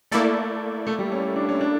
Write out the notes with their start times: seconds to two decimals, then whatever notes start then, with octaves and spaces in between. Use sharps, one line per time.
0.11 A3 A#3 E4 A4 D5
0.87 A3
0.99 G3
1.12 C#4
1.36 D4
1.49 C#4
1.61 D4